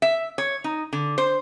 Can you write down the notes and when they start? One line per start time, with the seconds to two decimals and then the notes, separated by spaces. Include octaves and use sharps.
0.02 E5
0.38 C#5
0.64 D#4
0.93 D3
1.18 C5